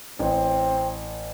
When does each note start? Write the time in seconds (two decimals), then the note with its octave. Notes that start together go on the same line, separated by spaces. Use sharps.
0.19 A1 C4